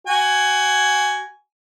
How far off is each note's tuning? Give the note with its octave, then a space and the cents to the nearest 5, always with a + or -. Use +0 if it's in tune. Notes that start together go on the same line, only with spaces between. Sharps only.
F#4 +20 G#5 +0